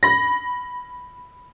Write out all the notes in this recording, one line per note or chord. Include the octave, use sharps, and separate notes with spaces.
B5 A#6